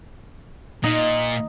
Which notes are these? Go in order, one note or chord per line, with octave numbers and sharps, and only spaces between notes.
A#2 D#4